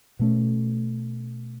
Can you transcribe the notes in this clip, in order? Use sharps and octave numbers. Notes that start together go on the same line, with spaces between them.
B2 A3 C#4